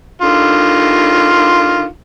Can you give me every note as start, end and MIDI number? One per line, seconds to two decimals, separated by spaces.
0.22 1.86 50
0.22 1.86 51
0.22 1.86 65